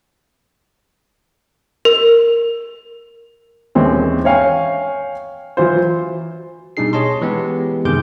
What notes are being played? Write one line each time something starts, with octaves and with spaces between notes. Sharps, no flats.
A#4
D#2 E3 G#3 C4 C#4
C#5 F5 G5 G#5 C#6
E3 F#3 F4 C5
B2 G3 D4 D#4 G#4 C7
G#4 C#5 D#5 A5 C6
E3 G#3 B3 G4
F#2 C3 D#3 G#4 D6 G6